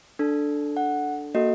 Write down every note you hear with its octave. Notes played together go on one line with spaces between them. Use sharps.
D4 A4
F#5
A#3 F#4 A4 D#5